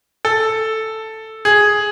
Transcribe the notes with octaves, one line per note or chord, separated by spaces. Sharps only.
A4
G#4